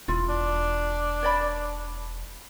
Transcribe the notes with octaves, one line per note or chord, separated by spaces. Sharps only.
E1 E4 F4
D4
C#5 D5 B5